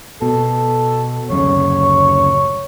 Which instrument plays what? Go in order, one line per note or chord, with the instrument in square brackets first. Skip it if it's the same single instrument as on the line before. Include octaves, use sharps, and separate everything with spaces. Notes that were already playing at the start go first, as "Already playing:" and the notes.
[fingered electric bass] B2 [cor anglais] A4
[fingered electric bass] D1 F#2 C#3 [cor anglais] C#5